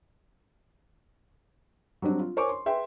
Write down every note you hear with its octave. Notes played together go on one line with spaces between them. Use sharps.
F#3 G3 C4 D4
F4
A#4 C5 C#5 G#5 C#6 D6
C6
G#4 B4 E5 G5 C6